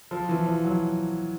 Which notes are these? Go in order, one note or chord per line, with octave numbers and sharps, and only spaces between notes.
F3
E3
F3
F#3